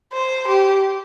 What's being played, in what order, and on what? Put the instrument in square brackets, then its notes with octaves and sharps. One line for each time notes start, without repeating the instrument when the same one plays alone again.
[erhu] C5
G4